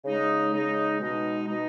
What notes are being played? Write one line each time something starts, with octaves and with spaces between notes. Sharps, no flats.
C#3 G#3 D#4
C#3 G#3 D#4
B2 G#3 D#4
B2 G#3 D#4